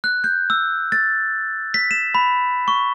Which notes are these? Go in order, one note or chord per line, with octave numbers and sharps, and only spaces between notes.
F#6
G6
E6
A6
B6
E7
B5
C#6